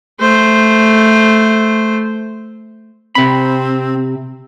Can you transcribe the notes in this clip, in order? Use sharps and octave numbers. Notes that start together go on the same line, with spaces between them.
A3 C5
C3 C4 B5